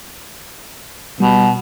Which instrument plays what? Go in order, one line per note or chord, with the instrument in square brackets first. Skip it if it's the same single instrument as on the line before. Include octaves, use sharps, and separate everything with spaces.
[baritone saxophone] B2 [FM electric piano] G3